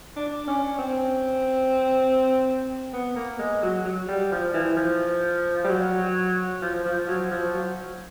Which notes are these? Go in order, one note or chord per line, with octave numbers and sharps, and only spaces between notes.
D4
C#4
C4
B3
A#3
G#3
F#3
F#3
G3
F3
E3
F3
G3
F#3
F3
F3
F#3
F3
F#3